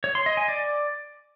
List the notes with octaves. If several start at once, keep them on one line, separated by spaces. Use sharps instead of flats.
C#5
C6
D#5
G#5
D5